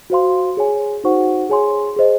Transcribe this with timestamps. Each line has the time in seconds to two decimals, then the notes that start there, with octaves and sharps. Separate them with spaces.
0.10 F#4 C5 F5 C6
0.57 G#4 C#5 G#5
1.04 D#4 F#4 C5 F#5 C#6
1.49 G#4 C#5 G#5 C6
1.96 G#4 C5 D#5